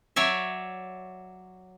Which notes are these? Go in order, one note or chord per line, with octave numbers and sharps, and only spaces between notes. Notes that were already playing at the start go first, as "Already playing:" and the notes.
F#3 C#5 D5 E5